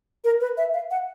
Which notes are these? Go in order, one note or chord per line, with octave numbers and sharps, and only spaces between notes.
A#4
B4
E5
F5
F#5